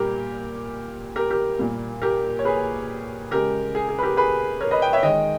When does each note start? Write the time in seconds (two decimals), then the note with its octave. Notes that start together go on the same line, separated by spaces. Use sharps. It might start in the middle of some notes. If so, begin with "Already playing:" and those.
Already playing: A#2 G3 A#3 G4 A#4
1.16 G4 A#4
1.30 G4 A#4
1.59 A#2 G3 A#3
2.02 G4 A#4
2.39 C#5
2.45 G#4 B4
3.31 C#3 G#3 G4 A#4
3.75 G#4
3.89 G#4
3.99 B4
4.03 G4 A#4
4.17 G#4 B4
4.61 A#4 C#5
4.71 B4 D#5
4.82 D#5 G5
4.93 C#5 E5
5.03 D#3 G#3 D#5 G5